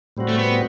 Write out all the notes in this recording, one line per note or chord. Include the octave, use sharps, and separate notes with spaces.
A2 G3 C4 F#4
A3
B3